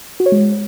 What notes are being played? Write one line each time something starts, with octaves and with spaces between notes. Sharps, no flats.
F#4
C#5
G#3